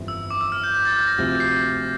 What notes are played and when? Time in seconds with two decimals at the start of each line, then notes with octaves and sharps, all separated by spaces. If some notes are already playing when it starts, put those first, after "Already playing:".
Already playing: G1 F2 E3
0.08 E6
0.31 D6
0.41 E6
0.52 F6
0.63 G6
0.75 G6
0.85 A6
0.96 G6
1.07 A#6
1.18 D2 C3 F3 A#6
1.40 C7